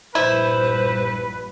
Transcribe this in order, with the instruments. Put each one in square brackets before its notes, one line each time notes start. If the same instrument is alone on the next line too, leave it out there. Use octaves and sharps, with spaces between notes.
[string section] A#1 G2 [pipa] E4 [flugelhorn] B4 [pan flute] C5